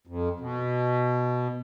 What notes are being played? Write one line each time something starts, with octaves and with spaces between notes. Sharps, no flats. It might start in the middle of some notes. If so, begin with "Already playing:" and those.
F2
B2